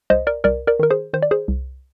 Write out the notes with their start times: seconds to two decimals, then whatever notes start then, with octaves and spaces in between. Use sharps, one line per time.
0.10 C2 C5 D#5
0.27 A#4 D5
0.44 C2 A#4 D5
0.67 A#4 D5
0.79 D#3 A#4
0.91 G#4 C5
1.13 D#3 C5
1.22 D5
1.31 G#4 C5
1.48 C2